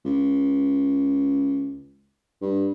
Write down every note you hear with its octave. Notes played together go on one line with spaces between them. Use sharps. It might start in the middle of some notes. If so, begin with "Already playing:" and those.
C#2
G2